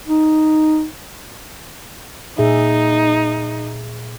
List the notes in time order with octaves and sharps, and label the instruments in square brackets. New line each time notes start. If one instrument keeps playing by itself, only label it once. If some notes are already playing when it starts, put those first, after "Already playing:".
[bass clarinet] D#4
[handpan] A#2 G#4 E5 [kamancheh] D#4